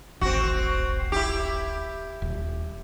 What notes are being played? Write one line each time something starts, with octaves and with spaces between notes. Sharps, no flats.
D1 G#1 C4 F#4
E4 G4
D#1